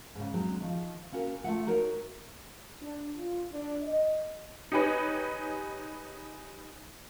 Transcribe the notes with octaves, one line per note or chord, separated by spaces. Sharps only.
G#2 C#3
F#3 G#3 C4 D4
D#3 F3
A#3 C#4 F#4 A#4
A3 F4 E5 F#5
D#4 F#4 A#4 C#5
D4
F4
D4
D#5
D#4 G4 G#4 B4 C#5